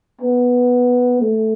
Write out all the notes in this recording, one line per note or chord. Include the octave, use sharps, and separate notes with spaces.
B3
A3